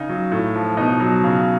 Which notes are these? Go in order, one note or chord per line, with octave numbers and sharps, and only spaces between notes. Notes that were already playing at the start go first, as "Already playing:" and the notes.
Already playing: C#3 D#4
F#3
A2
F3
B2 D#4
F#3
C#3